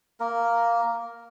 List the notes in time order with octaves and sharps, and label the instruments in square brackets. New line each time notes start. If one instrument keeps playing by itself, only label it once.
[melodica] A#3 A#4